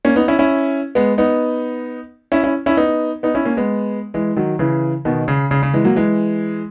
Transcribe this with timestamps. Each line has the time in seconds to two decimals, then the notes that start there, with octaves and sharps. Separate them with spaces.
0.05 A#3 C#4
0.16 B3 D#4
0.28 C#4 E4
0.39 C#4 E4
0.95 G#3 B3
1.18 B3 D#4
2.32 C#4 E4
2.44 C#4 E4
2.66 C#4 E4
2.77 B3 D#4
3.23 B3 D#4
3.35 C#4 E4
3.45 A#3 C#4
3.57 G#3 B3
4.14 E3 G#3
4.36 D#3 F#3
4.59 C#3 E3
5.05 B2 D#3
5.28 C#3
5.51 C#3
5.63 C#3
5.74 E3 G#3
5.84 F#3 A#3
5.96 E3 G#3